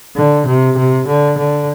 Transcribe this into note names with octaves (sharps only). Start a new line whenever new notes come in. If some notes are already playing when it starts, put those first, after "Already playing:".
D3
C3
C3
D3
D3